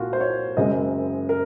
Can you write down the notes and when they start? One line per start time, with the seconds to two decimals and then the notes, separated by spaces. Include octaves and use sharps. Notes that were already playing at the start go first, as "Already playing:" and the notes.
Already playing: C2 A#2 F4 F#4
0.13 C5
0.21 C#5
0.57 F#1 F#2 C#3 G#3 C4 D#5
1.29 A#4